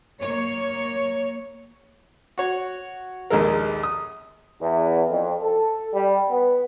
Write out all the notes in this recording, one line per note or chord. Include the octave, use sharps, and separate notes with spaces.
A#3 C#5
F#4 C#5
A#1 D#2 G#3 A4 A#4
D#6
E2
F2
A4
G3
B3